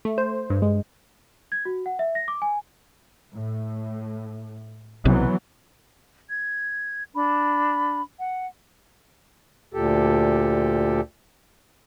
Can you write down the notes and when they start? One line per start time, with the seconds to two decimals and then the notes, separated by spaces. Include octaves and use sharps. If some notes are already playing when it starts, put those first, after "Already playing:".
0.05 A3
0.18 C5
0.50 G2
0.62 G#3
1.52 G#6
1.65 F#4
1.86 F#5
1.99 E5
2.15 A#6
2.28 D6
2.42 G#5
3.34 A2
5.05 B1 C3 E3 F#3 B3
6.29 G#6
7.13 D4 B5
8.19 F#5
9.74 D2 A#2 G4 A4